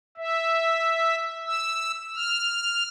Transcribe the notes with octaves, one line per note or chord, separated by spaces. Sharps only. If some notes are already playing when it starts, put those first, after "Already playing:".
E5
E6
F6